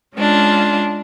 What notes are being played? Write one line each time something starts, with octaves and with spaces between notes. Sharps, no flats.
G#3 C#4 D4 F4